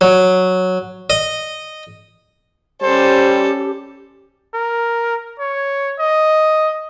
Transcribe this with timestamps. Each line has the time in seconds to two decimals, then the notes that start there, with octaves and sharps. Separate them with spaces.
0.01 F#3
1.10 D#5
2.82 G3 C#4 G4 A4 C5
4.54 A#4
5.39 C#5
5.99 D#5